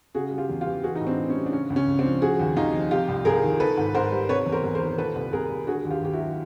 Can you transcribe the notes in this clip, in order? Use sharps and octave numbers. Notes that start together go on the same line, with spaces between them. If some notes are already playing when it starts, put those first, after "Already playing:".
C#3 F#4 G#4
G3
F4 G4
E2
F4 G4
E3
E3 F#4 G#4
D#4
A2
C4 D4
A2
C#4
G3
D4
C#3 C#4
C#2
C#4
C#2
C4 D4
F3
C#3 F#4 G#4
D#2
D#2 D#4 F4
F3
C3 F4 G4
C2
C2 G#4 A#4
D#3
D#3 A4 B4
G#2
G#2 A#4 C5
G3
C3 B4 C#5
E2
A#4 C5
E2
A#4 C5
D#3
A#2 A4 B4
C2
C2 G#4 A#4
G3
D3 F#4 G#4
D#2
F4 G4
D#2 G4
E4 F#4
F#3